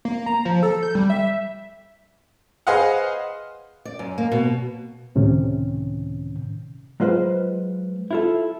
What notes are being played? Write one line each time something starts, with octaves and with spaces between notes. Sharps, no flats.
A#3
A#5
F3
A4
G6
G3
E5
G#4 B4 C5 D#5 F5 F#5
D5
F#2
A#3
B2
C#2 A2 C3 D#3 C#4
F#3 G#3 F4 B4 C5
E4 F4 A4